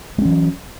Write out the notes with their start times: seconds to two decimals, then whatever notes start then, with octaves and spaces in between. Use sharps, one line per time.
0.18 G#3
0.22 C#4
0.25 E3
0.29 F#3